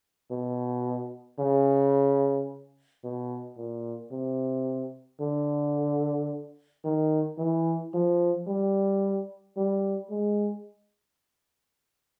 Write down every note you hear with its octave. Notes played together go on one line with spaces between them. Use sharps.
B2
C#3
B2
A#2
C3
D3
D#3
E3
F3
G3
G3
G#3